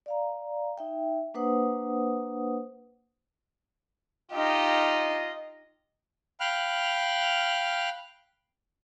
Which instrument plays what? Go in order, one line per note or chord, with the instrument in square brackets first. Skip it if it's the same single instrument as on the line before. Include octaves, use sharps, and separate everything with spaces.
[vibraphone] D5 F5 A#5
D#4 E5 G5
A#3 D4 B4 C5 F#5 D#6
[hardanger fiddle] D#4 G4 [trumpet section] F4 D#5
[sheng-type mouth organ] F5 G5 B5 F6 F#6